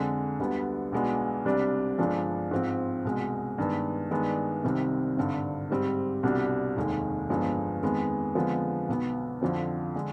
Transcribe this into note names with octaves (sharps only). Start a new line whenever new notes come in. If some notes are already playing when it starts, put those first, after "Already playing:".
Already playing: F2 D3 G#3
D2 D3 G3 B3
B1 B2 G#3 B3 D4
C2 C3 G3 D4
G1 G2 F3 G#3 D4
G#2 F3 C4
C2 B2 G#3
G2 D#3 G#3 B3
G2 D#3 G#3 B3 D4
C2 C3 D#3 G3 C4
G#1 G2 D3
G#2 G3 C4
C2 B2 G3 D4
F1 D#2 D#3 G#3
G1 G2 F3 G#3 B3
F2 D#3 G#3 B3
F2 D3 F3 G#3 B3
B1 B2 B3
F2 D3 F3 C4
D3 G#3